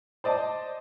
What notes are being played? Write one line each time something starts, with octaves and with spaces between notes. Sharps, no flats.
C5 D5 D#5 A5